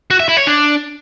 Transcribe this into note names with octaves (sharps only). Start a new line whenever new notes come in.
F#4
E5
E4
C#5
D4